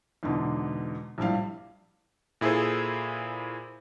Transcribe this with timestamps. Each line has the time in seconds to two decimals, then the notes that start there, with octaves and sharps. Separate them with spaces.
0.23 E2 G#2 B2 D3
1.18 A#1 A2 F3 G3 F5
2.41 A#2 E4 G#4 A4 C5